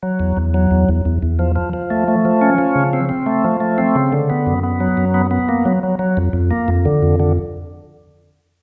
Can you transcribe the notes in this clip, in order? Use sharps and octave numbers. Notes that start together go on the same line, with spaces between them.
F#3
E2
E2
F#3
E2
E2
E2
E2
F3
F3
F3
A3
A3
F3
C#4
F3
C#3
C4
C4
A3
F3
A3
C4
C#3
D3
B3
F#2
B3
F#3
F#2
B3
B3
A#3
F#3
F#3
F#3
F2
F2
A#3
F2
D3
F2
D3